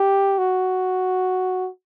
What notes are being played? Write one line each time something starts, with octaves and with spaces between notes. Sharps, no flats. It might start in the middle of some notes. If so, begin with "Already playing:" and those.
Already playing: G4
F#4